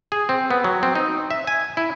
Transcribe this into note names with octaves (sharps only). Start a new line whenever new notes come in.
G#4
C4
B3
F#3
C4
D#4
E5
G#5
E4